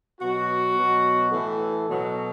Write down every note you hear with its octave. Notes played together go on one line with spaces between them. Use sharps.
B2 F#3 F#4
B2 F#3
A2 E3 A4
B2 F#3